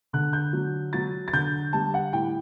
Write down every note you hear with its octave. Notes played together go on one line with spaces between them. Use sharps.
D3 F#6
G6
F#3
F#3 A6
A6
D3 G6
G3 A5
F#5
A2 G5